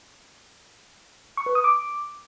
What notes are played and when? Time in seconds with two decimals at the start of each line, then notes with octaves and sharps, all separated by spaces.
1.37 C#6
1.46 B4
1.55 D#6
1.64 D6